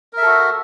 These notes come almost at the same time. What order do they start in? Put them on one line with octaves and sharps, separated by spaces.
A#4 E5 A4 F#4